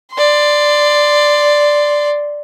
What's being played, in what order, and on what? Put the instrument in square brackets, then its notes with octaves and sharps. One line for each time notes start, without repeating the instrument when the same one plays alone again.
[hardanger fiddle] D5 C6